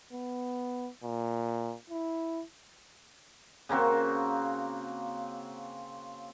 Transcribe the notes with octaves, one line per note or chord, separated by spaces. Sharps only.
B3
A#2
E4
C#3 A#3 C4 F#4